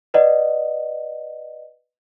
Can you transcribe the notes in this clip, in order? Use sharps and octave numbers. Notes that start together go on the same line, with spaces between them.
B4 D5 D#5 F#5